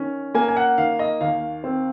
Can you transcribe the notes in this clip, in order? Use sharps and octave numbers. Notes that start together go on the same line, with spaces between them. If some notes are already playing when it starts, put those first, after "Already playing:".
Already playing: D#3 C#4
A#3 G#5
G#5
F#5
D#3 F5
D#5
D#2 F5
C4